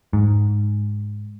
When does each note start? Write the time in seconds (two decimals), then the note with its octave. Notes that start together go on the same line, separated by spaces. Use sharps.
0.13 G#2